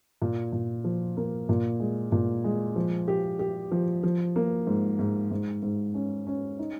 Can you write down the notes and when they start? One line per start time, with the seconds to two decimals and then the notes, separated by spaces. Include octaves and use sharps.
0.22 A#2
0.52 A#2
0.84 F3
1.17 A#3
1.49 A#2
1.80 G#3
2.12 A#2
2.44 G#3
2.76 F3
3.08 G4
3.39 G4
3.71 F3
4.03 F3
4.36 A#3
4.67 G#2
4.99 G#2
5.31 G#2
5.63 G#2
5.94 C#4
6.27 C#4
6.59 D#4